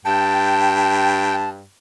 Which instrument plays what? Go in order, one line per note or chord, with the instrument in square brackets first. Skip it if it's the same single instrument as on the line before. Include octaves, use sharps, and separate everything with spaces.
[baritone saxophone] G2 [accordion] G5 [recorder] A5